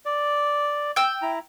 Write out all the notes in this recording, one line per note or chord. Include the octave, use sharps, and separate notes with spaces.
D5
G5 E6
E4 A#5